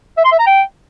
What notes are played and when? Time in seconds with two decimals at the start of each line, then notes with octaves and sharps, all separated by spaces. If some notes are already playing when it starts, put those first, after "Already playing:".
0.17 E5
0.25 C6
0.32 E5
0.39 A#5
0.47 G5